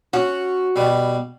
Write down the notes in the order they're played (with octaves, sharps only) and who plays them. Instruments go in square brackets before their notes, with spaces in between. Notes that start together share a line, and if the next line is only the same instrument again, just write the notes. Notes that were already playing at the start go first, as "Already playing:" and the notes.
[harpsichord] C#4 [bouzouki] F#4
[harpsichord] B2 G3 B3